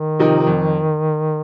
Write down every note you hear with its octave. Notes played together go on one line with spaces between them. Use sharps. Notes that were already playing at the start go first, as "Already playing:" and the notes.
Already playing: D#3
C3 F3 D#4 A#4
F2